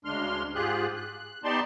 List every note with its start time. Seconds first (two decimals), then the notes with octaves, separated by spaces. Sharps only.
0.05 D2 C#3 G#3 D4 C6 F6
0.55 G#2 F4 G4 G#4 F#6
0.96 F#6
1.44 B3 D#4 G4 D5 A5 C6